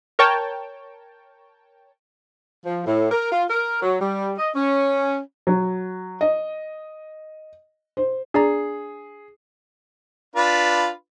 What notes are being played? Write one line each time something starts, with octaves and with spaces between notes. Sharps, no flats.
A#4 C#5 G5 A5
F3
A2
A#4
F4
A#4
F#3
G3
D#5
C#4
F#3
D#5
C5
D4 G#4 D5 A#5
D4 F4 B4